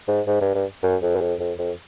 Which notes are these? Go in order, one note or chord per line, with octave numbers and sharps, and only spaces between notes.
G#2
G#2
G2
G2
F#2
F2
F#2
F2
F2
F2